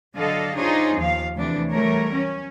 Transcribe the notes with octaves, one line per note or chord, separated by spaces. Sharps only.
D3 F#3 A4 D#5 F5
D4 D#4 F4 G#4 C5 C#5
D#2 F3 F5
D2 C3 E3 D4
E3 F#3 G3 A3 A#4 C#5
C#4